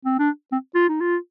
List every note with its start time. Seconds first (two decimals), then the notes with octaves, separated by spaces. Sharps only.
0.05 C4
0.19 D4
0.52 C4
0.75 F4
0.89 D#4
1.01 F4